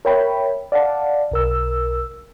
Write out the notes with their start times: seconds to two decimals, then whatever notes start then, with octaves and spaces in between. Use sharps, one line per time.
0.05 A#4 C#5 E5 G5 B5
0.72 D5 F5 F#5 A5
1.32 B1 A#4 E6